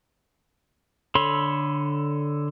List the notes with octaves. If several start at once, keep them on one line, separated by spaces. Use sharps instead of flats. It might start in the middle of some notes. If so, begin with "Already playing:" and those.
D3 A4 C#5 B5 C6